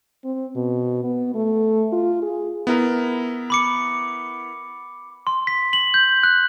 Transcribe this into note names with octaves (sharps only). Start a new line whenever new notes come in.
C4
B2
B3
A3
F4
G#4
B3 E4 A#4
B5 D6 C#7
C6
B6
F#7
G6
F#6